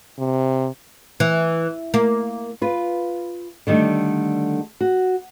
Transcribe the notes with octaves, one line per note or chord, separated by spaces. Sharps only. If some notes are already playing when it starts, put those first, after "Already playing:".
C3
E3
A#3
F4 B4
D3 D#3 G3 A3
F#4